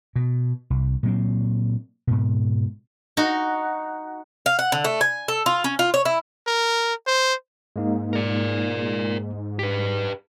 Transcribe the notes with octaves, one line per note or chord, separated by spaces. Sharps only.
B2
C2
A#2 F#3 C4
G#2 B2
D#4 F#4
F5
F#5
D3
A3
G#5
A4
F4
C#4
F4
C#5
E4
A#4
C5
G#2 G#3 A#3 D#4
A#4 D5
G4 B4 B6